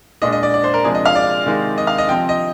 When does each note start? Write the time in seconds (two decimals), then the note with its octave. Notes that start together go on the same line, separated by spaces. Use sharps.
0.22 A#2 G#3 D4 D#5
0.32 D#5
0.43 D5
0.54 D5
0.64 C5
0.74 A#4
0.84 C3 F3 G#3 D4 G#4
0.95 D#5
1.05 F5
1.15 D5
1.46 C3 D#3 G#3 C4 D#4
1.78 D#5
1.87 F5
1.98 D#5
2.08 C3 F3 C4 G5
2.29 D#5